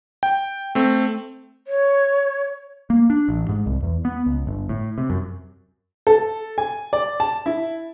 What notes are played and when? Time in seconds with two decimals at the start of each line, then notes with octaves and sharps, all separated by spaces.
0.23 G5
0.75 A3 C4
1.67 C#5
2.90 A#3
3.10 D4
3.29 A1
3.49 G#2
3.66 C2
3.83 E2
4.05 B3
4.26 C#2
4.47 G1
4.69 A2
4.98 C3
5.10 F#2
6.07 A4
6.58 G#5
6.93 D5
7.20 A5
7.46 E4